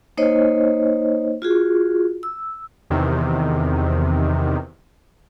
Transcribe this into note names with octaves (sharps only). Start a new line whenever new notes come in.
A#3 D#4 C5 C#5 D#5
F4 F#4 G#4
E6
E2 C3 D#3